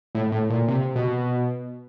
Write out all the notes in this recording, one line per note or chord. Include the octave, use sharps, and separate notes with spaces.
A2
A2
A#2
C3
B2